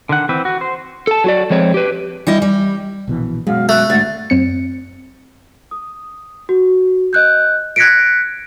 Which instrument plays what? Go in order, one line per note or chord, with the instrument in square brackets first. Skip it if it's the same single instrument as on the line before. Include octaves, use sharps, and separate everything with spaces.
[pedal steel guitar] D3 D#3 F#5
E3 C4 B4
F#4
C5
[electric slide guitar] A4 A5
F#3 F#4 D5
F3 G#3 C4 C#5
G4 B4
[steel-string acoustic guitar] G3 E4 D#5
G3
[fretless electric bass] A#1 B2 E3
[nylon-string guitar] F#2 [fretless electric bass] B2 G#3 [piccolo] F5
[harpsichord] A3 [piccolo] F#6
[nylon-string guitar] D2 G#2 [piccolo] A6
[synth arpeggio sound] F#2 C4 C#7
[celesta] D#6
F#4
D#5 F#6 G6
F#6 G#6 A#6 B6 C#7 D7